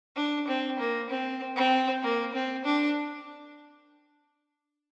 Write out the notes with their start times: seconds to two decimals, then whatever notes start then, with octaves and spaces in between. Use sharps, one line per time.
0.16 D4
0.47 C4
0.79 A#3
1.09 C4
1.56 C4
2.03 A#3
2.34 C4
2.64 D4